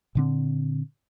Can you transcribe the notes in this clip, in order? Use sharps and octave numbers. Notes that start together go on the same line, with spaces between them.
A#2 D3 C4